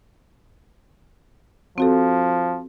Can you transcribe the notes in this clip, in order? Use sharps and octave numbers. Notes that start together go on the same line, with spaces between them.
F3 C4 F#4 A4